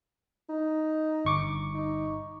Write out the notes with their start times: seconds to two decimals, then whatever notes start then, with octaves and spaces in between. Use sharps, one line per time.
0.49 D#4
1.25 G1 C#6 D6
1.75 D#4